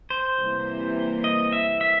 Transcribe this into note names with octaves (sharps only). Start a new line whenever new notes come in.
C5
C3 E3 G3 A#3
D#5
E5
E5